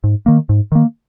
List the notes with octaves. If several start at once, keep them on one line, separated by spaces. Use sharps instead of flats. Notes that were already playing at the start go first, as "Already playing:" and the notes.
G#2
D#3 A#3
G#2
D#3 A#3